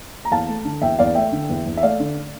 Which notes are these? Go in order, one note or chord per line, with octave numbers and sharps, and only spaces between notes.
A#5
E2 F5 A5
A3
D3
E2 E5 G5
E2 D5 F5
A3 E5 G5
D3
E2
E2
E5
A3 D5 F5
D3